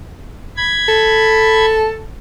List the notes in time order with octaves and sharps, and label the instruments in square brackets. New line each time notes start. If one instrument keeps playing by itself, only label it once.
[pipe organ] B5 G#6
[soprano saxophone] A4